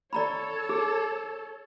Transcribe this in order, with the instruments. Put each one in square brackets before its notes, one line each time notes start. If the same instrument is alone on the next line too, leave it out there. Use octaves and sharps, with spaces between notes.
[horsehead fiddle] A4 C#5 [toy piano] D5 A#5 B5
[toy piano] G#4